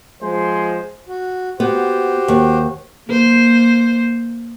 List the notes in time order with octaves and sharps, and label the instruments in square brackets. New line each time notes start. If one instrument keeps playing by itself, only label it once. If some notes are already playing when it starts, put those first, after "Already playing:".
[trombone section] F3 G#3 C5
[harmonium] F#4
[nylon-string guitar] B3 [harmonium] F#4 G4 C5
[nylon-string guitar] D#2
[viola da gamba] A#3 C5